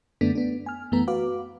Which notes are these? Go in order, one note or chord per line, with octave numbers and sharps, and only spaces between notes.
F#2 D3 A3 B3 D4 B6
B3 D4
G#5 F6
F#2 E3 A3 B3 A#5
F#4 B4 F5 D6